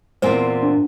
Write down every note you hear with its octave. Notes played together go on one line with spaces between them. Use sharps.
E2 A#2 C4 C5 G#5
D4